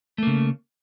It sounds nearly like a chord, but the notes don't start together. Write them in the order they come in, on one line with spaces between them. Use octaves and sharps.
A3 A#3 C#3